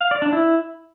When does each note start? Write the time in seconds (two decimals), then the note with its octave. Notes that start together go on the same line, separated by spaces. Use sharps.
0.01 F5
0.11 D5
0.22 D4
0.33 E4